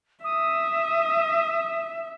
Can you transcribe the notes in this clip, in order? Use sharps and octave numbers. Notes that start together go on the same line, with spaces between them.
E5 D#6